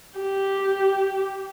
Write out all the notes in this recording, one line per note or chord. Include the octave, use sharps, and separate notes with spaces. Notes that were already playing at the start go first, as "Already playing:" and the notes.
G4